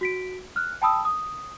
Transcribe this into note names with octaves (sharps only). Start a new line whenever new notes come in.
F#4 B6 D7
F6 F#6
G5 A5 B5 D#6 E6
D#6